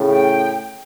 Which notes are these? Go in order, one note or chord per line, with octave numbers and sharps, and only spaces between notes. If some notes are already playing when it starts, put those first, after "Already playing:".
Already playing: A2 C#3
G5